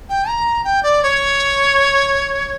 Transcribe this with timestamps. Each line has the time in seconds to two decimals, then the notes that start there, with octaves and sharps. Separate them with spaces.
0.09 G5
0.28 A#5
0.64 G5
0.83 D5
1.03 C#5